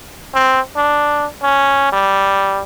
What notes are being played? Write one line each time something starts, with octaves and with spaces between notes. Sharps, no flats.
C4
D4
C#4
G3